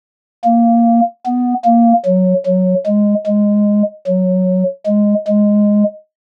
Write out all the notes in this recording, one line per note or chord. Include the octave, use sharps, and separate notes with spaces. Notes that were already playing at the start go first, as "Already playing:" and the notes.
A#3
B3
A#3
F#3
F#3
G#3
G#3
F#3
G#3
G#3